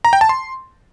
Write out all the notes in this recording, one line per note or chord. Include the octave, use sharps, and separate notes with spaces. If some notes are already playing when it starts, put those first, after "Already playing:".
A#5
G5
A5
C6